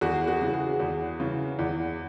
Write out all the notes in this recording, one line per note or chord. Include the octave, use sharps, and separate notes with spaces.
E2 F#4 G#4
F#4 G#4
C#3 E3
F#4 G#4
E2
C#3 E3
E2